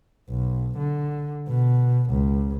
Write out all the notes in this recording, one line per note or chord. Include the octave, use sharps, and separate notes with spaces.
B1
D3
B2
C#2